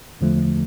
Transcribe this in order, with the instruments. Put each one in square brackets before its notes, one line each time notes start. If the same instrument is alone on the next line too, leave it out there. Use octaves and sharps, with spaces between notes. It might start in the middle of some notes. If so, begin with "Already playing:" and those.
[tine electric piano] E2 D3 F3 A3